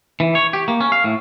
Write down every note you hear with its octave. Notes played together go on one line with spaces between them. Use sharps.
E3
C#5
G4
A#3
C#4
F5
A2